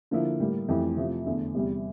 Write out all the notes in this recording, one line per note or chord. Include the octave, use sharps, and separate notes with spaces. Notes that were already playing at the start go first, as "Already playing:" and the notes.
D3 F3 A#3 E4
A2 G3 A#3
F2 E3 A3 E4 G4
C3 F3 A3
E2 D3 A3
E2 C3 G3